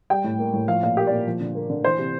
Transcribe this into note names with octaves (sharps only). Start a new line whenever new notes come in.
G3 G5
A2
A#3
A2
F3 F5
A#2 F5
A#3 G4
D5
A#2
F3
D3
A#3
D3
E3 C5
C3